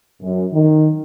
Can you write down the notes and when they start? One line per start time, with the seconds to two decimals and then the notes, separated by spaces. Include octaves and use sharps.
0.22 F#2
0.53 D#3